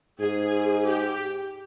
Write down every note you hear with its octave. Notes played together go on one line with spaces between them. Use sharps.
G#2 G#4
G4